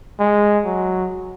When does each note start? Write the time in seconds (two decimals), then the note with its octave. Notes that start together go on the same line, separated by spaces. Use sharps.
0.20 G#3
0.65 F#3